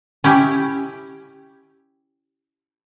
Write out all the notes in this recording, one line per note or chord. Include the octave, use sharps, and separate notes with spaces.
C#4 E4 G4